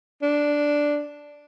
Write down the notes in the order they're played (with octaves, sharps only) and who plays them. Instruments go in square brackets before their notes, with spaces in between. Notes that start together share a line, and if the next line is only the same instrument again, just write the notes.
[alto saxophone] D4